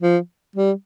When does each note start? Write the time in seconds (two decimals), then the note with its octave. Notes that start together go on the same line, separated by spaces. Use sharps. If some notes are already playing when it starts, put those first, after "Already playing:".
0.02 F3
0.55 G3